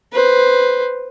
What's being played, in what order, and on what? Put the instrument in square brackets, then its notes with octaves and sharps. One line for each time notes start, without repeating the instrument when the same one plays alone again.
[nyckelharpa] B4 C5